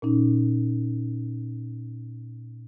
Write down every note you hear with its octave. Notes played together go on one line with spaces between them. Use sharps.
A#2 C#4 D#4